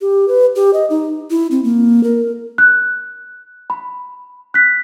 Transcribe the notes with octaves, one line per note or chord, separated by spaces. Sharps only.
G4
B4
G4
D#5
D#4
E4
C4
A#3
A#4
F#6
B5
F#6 B6